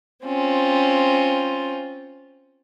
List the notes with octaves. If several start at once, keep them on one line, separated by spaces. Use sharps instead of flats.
C4 C#4 F4